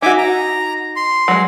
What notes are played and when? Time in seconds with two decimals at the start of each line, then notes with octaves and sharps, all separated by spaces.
0.02 D#4 F#4 E5 G#5 D6
0.18 A#5
0.96 C6
1.28 F#3 G#3